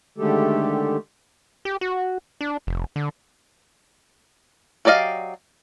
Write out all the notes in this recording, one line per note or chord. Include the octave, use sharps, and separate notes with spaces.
D3 D#3 G#3 A3 G4 A4
G4
F#4
D4
F1
D3
F#3 G4 D5 D#5 F5